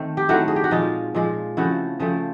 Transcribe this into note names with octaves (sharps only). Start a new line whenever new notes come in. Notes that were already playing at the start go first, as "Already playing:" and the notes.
Already playing: D#3 A3 C4
G4
D#3 F#3 A3 C4 E4 F#4
G#4
G4
F#4
A#2 F3 G#3 D#4 F4
A#2 F3 G#3
C#3 F3 A3 C4 E4 F#4
C#3 F3 A3 C4